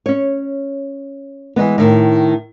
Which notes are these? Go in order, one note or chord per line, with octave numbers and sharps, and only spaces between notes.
C#4 C#5
E3 F#3 G#3 B3
A2 D#3